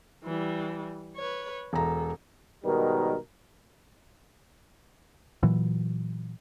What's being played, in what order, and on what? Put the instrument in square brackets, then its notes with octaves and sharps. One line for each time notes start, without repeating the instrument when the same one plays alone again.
[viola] E3 G3
B4 C#5
[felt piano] E1 A#5 [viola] A4
[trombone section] G#2 B2 D#3 G3 A#4
[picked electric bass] A#2 E3 F#3